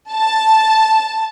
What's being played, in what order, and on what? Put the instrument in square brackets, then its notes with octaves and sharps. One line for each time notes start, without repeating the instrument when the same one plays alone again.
[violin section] A5